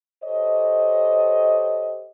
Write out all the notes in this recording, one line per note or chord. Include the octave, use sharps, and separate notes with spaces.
G4 A4 C5 C#5 D#5